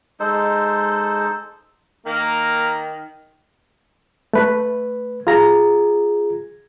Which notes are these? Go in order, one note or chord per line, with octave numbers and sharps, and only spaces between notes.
G#3 D#4 A4 C5
D#3 A#3
A3 B4
F4 G#4 A#5